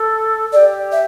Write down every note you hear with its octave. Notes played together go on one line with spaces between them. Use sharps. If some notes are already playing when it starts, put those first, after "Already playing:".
Already playing: A4
G4 A4 D5
E5